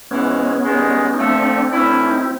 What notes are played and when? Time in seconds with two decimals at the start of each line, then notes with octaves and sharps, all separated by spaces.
0.11 G#2 E3 G#3 B3 C#4
0.64 G2 D#3 G#3
1.14 D#4
1.18 A#2 F3 A3 C4 D4
1.73 E3 A3 C#4 E4
2.03 D4
2.10 D#4
2.18 E4